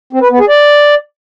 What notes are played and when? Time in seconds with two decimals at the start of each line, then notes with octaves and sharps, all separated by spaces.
0.13 C4
0.22 B4
0.31 B3
0.40 G#4
0.49 D5